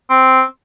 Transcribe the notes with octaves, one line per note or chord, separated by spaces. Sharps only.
C4